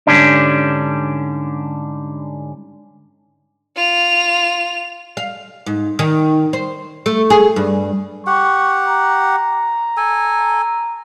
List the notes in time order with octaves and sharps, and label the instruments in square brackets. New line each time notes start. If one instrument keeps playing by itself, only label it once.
[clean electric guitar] G#2 D3 G3 C#4 D4
[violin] F4 F7
[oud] F5
G#2
D#3
C5
A3
G#4
G2
[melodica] G4 F#5 [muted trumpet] C#6
[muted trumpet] A#5
[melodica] A4 G#5